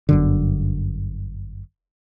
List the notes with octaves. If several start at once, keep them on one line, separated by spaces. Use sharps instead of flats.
G1 F#2 D3